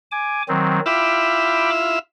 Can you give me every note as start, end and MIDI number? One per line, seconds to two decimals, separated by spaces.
0.12 0.42 80
0.12 0.42 86
0.48 0.80 51
0.48 0.80 54
0.48 0.80 60
0.86 1.99 64
0.86 1.99 65
0.86 1.99 76
0.86 1.70 79
0.86 1.70 83
0.86 1.70 86